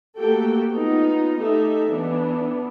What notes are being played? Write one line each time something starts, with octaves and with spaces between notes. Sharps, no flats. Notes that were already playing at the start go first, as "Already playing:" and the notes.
A3 A#3 F#4 G4 A4 G5
B3 D#4 F4
A3 D#4 G4 A4 E5
E3 B3 D4